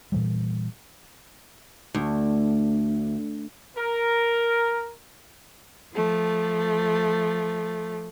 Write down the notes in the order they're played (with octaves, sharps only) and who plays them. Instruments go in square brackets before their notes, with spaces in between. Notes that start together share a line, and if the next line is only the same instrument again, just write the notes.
[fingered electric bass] A#2 E3 G3
[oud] D2
[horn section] A#4
[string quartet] F3 A3